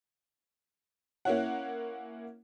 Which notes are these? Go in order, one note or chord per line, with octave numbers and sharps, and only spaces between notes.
A#3 C#4 E4 C#5 F#5